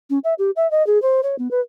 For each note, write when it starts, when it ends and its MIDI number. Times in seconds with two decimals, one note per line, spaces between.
0.10 0.19 61
0.24 0.34 76
0.38 0.51 67
0.56 0.69 76
0.71 0.85 75
0.87 1.01 68
1.02 1.21 72
1.23 1.36 73
1.38 1.50 59
1.51 1.60 71